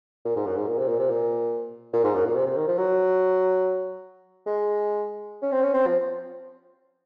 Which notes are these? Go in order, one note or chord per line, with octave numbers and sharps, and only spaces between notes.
A#2
G#2
F#2
G#2
A#2
C3
A#2
C3
A#2
A#2
G#2
F#2
A#2
C3
C3
D#3
F3
F#3
G#3
C#4
C4
C#4
C4
F3